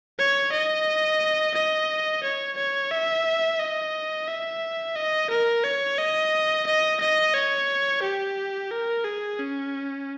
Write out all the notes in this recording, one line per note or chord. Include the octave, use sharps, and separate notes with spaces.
C#5
D#5
D#5
C#5
C#5
E5
D#5
E5
D#5
A#4
C#5
D#5
D#5
D#5
C#5
G4
A#4
G#4
C#4